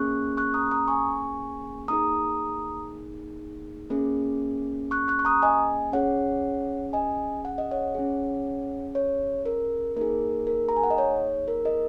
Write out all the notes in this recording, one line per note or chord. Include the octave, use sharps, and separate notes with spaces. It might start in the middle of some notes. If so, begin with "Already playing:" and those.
Already playing: A#3 C#4 G#4 C#6 F#6
C#6 F#6
A#5 D#6
A#5 D#6
G#5 C#6
A#3 D#4 G#4 A#5 D#6
A#3 C#4 G#4
C#6 F#6
C#6 F#6
C#6
A#5 D#6
D#5 G#5
C#4 G#4 C#5 F#5
D#5 G#5
F#5
D#5
C#5 F#5
C#4 G#4
C#5
A#4
A#3 D#4 G#4 A#4
A#4
A#5
G#5
F#5
D#5
C#5
A#4
A#4 D#5